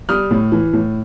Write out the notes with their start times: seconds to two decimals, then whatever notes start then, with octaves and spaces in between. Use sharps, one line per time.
0.09 G3 D#6 F6
0.31 A2
0.52 E3
0.73 A2